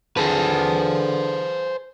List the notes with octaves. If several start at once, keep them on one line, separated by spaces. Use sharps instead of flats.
D3 G#4 B4 C5 A5